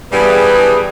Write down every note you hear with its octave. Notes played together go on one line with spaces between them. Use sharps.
G2 E3 G3 B3 G#4 B4